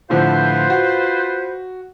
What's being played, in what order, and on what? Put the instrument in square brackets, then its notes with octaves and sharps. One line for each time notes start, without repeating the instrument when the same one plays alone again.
[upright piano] A2 D3 F3 [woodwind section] F4 B4 C5
[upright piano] F#4